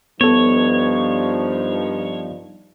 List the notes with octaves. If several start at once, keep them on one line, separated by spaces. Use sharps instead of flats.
G2 F3 B3 D#4 A4 C#5